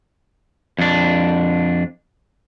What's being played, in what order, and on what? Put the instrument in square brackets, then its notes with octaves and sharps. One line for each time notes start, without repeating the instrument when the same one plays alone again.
[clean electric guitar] F2 D4